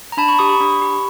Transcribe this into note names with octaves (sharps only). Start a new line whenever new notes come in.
A#5
D4 A5 B5
B5 C#6
G4 C#6 D#6
B5 C#6
D4
G4